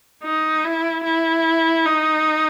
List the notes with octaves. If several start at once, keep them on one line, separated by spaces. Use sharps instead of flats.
D#4
E4
E4
D#4